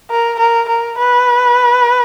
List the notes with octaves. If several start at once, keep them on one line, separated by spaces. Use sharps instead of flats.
A#4
A#4
A#4
B4